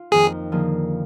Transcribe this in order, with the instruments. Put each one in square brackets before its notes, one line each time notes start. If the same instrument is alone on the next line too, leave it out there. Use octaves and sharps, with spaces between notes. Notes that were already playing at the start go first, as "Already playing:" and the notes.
Already playing: [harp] F4
[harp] F2 D#3 A#3 [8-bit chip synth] G#4
[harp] D3 F3 A#3 F4 G#4